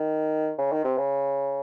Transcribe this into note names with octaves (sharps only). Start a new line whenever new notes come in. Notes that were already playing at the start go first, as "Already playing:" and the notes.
Already playing: D#3
C#3
D#3
C3
C#3